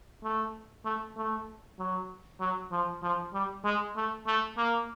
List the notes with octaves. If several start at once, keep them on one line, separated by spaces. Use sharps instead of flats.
A3
A3
A3
F#3
F#3
F3
F3
G3
G#3
A3
A3
A#3